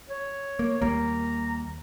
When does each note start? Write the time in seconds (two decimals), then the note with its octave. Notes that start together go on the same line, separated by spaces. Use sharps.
0.10 C#5
0.59 A#3
0.82 D#2 G3 A#3 A#5